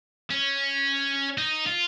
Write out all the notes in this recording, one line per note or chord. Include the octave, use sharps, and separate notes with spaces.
C#4
D#4
F4